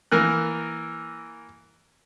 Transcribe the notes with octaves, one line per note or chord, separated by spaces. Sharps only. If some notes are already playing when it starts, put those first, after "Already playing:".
E3 A#3 A#4 F#6